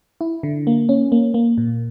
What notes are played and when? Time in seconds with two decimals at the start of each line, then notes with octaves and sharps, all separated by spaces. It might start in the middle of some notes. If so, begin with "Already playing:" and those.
0.21 E4
0.43 D3
0.67 A#3
0.89 C#4
1.12 A#3
1.34 A#3
1.58 A#2